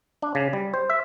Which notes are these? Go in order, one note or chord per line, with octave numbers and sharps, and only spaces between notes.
D4
C#3
G3
C5
E5